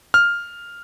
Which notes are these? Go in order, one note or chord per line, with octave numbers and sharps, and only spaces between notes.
F6